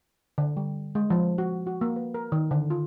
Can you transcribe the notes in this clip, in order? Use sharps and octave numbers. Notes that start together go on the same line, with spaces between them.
D3
G3
G#3
F3
F#4
F#4
A#3
B4
A#4
D#3
D3
F4